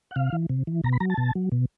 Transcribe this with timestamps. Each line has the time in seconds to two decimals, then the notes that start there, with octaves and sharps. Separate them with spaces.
0.11 F#5
0.16 C3 F5
0.33 E3
0.49 C3
0.67 E3
0.84 B2 A#5
0.92 B5
1.00 F#3 A#5
1.10 A5
1.17 B2
1.35 F#3
1.52 B2